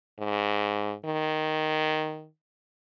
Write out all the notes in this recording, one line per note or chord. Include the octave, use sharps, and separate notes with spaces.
G#2
D#3